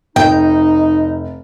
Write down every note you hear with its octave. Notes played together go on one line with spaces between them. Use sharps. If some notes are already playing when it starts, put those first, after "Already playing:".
F1 D#4 G5